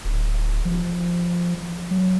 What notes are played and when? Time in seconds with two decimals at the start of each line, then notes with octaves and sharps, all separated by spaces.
0.05 D1
0.65 F3
1.91 F#3